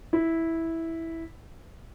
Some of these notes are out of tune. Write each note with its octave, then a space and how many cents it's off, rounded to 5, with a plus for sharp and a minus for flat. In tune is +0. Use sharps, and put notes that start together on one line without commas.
E4 -10